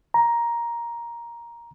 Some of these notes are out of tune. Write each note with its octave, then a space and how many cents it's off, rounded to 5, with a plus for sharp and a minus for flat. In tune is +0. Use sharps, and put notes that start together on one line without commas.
A#5 +10